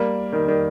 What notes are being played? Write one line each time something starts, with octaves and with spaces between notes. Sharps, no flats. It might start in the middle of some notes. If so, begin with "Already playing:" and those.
Already playing: G3 A#3
D#3 G3
D#3 G3